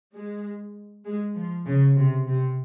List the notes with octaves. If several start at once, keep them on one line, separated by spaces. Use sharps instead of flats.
G#3
G#3
F3
C#3
C3
C3